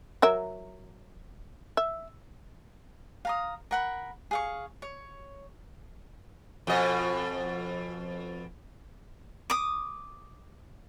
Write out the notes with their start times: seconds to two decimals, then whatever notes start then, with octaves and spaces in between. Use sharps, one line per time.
0.22 F#3 A#4 E5
1.77 E5
3.25 F5 A#5 D#6
3.71 A#4 F#5 B5
4.31 G#4 F5 C#6
4.82 C#5
6.67 F2 B2 D#5
9.50 D6 D#6